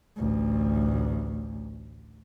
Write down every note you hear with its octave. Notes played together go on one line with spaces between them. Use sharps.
A1 D2